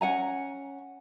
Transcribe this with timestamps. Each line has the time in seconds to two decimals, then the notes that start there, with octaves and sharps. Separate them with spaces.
0.01 C#4 F#5 G#5 A#5